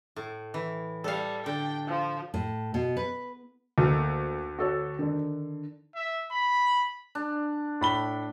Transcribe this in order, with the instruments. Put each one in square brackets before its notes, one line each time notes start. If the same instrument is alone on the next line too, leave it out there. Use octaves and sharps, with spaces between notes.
[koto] A2
E3
[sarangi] G3 [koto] A4 F5
[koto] D3 [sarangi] G5
[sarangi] F3
[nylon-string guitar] A2
B2
B4
[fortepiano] D2 [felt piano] A3 A#3 D#4
[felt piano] F#4 A4 C#5
D3 D#3
[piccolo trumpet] E5
B5
[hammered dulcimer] D4
[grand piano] A2 B5 G7